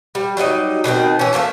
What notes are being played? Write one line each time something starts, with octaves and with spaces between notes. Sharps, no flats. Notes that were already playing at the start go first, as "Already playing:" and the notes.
G3
F#3 G3 D#4 D#5
B2 D#3 A3 C4
E3 C#4
A3 A#3 C#4 A4